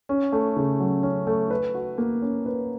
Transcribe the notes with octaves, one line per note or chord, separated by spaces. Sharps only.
C#4
A3
C#3
F#3
C#4
A3
B4
F#4
A#3
C#4
B4